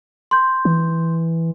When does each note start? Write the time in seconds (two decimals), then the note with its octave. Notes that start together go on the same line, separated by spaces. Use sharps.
0.31 C6 G6
0.65 E3